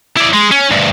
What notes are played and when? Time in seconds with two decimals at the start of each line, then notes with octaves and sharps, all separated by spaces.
0.17 E4 D5
0.34 G#3
0.51 C#4
0.71 D2 G2